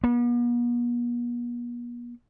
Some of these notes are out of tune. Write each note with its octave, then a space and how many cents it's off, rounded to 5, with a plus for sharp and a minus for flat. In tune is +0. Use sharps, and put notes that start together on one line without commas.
B3 -45